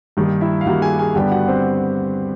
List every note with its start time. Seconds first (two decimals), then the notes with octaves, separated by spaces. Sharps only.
0.17 G2 D#3 G3 A#3
0.41 E4 E5
0.61 F5
0.65 G2 D#3 G3 A#3 F#4 F#5
0.82 G#4 G#5
0.99 G#4 G#5
1.15 G2 D3 G3 B3 D4 G4 G5
1.32 F#4 F#5
1.48 C4 C5